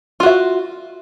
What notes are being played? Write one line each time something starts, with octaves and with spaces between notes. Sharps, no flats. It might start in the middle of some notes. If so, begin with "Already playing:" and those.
F4 F#4 E5